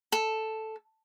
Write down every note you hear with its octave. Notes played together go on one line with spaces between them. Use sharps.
A4